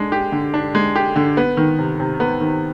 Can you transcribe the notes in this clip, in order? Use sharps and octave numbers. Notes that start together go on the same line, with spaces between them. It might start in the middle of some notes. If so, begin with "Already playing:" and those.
Already playing: G#3 D4
G4
D3
D4
G#3
G4
D3
B3
D#3
C3
C3
B3
D#3